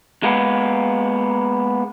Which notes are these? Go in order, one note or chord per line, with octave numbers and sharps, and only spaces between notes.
G#3 A#3 B3